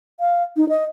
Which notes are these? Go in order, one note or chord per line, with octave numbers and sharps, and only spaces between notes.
F5
D#4
D#5